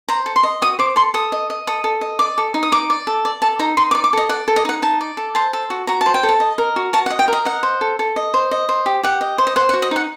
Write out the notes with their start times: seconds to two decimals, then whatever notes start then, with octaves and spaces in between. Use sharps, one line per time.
0.09 C5 A#5
0.26 A4
0.36 C6
0.43 D#5
0.62 F#4 D#6
0.79 C5 D6
0.96 A4 C6
1.14 A4 D#6
1.32 D#5
1.50 D#5
1.67 A4 D#6
1.84 A4
2.01 D#5
2.19 D5 D6
2.38 A4
2.54 D#4
2.63 D#6
2.72 D#4 D6
2.90 D5
3.07 A4
3.25 D5
3.42 A4 A5
3.59 D#4 A#5
3.77 D#4 C6
3.91 D6
3.95 D5
4.04 D6
4.13 A4 D#5
4.29 D5 F#5
4.48 A4
4.56 D#5
4.65 D#4 F#5
4.82 D#4 A5
5.01 D5
5.17 A4
5.35 C5 A5
5.53 A4
5.70 F#4
5.87 F#4 A#5
6.01 A5
6.06 C5
6.14 G5
6.23 A4
6.29 A5
6.40 D#5
6.58 A#4
6.76 F#4
6.93 F#4 A5
7.06 F#5
7.10 D#5
7.19 G5
7.28 A#4 D#5
7.45 D#5 F#5
7.63 C5
7.81 A4
7.99 A4
8.16 D#5
8.34 C5
8.51 D#5
8.69 C5
8.86 G4
9.03 G4 F#5
9.21 D#5
9.38 C5
9.47 D#5
9.56 C5 F#5
9.69 F#5
9.73 F#4
9.82 D#5
9.91 D#4 F#5